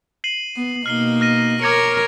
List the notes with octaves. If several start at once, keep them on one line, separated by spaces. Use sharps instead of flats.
C7 D#7 F#7
B3
B2 A#3 D#4 F6 C7 G7
F6 A#6 D#7
A#4 C#5 D6 G#6 C#7